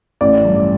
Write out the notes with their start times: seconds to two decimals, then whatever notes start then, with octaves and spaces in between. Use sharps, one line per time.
0.21 A1 D5
0.45 G2